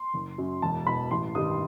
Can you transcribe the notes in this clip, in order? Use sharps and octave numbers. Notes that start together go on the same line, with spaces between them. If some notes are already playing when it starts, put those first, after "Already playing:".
Already playing: C6
F#1
F#2 F#3
E1 A5
E2 B2 B5
A1 C6
G2 D#3 G3 D#6